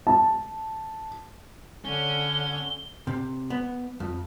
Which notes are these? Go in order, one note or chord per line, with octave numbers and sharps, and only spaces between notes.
A5
D3 C#4 G7
C3
B3
F2